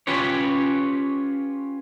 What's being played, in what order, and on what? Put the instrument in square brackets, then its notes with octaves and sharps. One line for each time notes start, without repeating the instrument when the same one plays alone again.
[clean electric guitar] C#4 F4 G4 B4 C#5